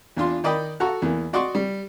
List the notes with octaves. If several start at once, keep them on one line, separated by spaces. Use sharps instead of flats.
E2 D4 F4 C6
D#3 D5 D#5 G5 B5
F#4 A4 F#5 A#5 C#6
E2 E3 A#3
F#4 D5 D#5 F#5 C6 C#6
G3